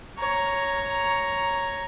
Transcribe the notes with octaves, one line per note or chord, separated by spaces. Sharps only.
C#5 A#5